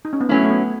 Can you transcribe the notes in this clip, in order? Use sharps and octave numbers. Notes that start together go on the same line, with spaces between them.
D#4
C#4
B3
F#3 A3 C#4 E4
A3
B3